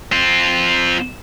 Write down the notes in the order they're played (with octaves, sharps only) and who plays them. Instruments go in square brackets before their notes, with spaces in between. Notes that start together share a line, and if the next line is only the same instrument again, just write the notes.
[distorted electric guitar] C4 F4